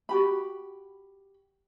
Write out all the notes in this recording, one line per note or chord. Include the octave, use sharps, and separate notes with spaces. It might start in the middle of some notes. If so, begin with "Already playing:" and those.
F#4 G4 B5